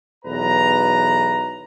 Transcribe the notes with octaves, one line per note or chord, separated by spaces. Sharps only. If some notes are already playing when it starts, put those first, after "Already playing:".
B1 E2 B4 A#5